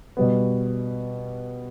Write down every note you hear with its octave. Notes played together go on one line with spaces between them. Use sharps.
B2 G3 B3